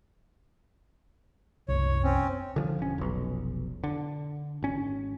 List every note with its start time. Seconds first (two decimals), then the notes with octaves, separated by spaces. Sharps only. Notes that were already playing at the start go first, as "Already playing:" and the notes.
1.68 F#1 C2 C#5
2.04 C4 C#4
2.56 D3 E3 F3
2.79 E1 C#4
2.98 F1 B1
3.84 D3
4.63 G#1 C#4